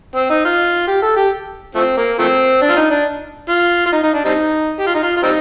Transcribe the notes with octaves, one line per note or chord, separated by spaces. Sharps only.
C4
D#4
F4
G4
A4
G4
F3 A3 C4
A#3
F3 A3 C4
D4
F4
D#4
D4
F4
F4
D#4
D#4
D4
G3 C4 D#4
G4
F4
D#4
F4
F4
G3 C4 D#4